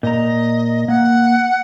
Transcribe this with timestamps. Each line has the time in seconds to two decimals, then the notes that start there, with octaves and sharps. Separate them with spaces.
0.03 A#2 D#5 A#5
0.88 A#3 F#5